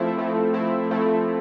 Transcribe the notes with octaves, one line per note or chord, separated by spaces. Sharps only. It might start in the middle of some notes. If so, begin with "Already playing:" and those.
Already playing: F3 A3 C4 E4
F3 A3 C4 E4
F3 A3 C4 E4
F3 A3 C4 E4